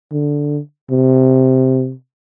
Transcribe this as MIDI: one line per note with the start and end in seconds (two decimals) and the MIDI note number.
0.12 0.59 50
0.91 1.93 48